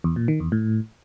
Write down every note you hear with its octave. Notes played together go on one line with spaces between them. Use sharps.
E2
A#2
D#3
E2
A2